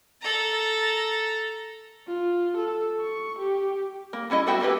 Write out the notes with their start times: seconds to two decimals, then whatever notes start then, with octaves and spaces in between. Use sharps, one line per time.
0.22 A4 A#5
2.07 F4
2.57 A4
3.01 C#6
3.39 G4
4.13 A#3
4.30 G3 C#4 E4 D#5
4.46 G3 B3 F#4 E5 G5
4.60 E3 F3 A#3 G4 B4